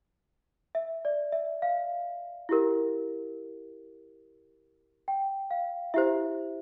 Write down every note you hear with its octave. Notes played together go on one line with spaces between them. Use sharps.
E5
D5
E5
F5
E4 G4 A#4
G5
F5
E4 G4 C5 E5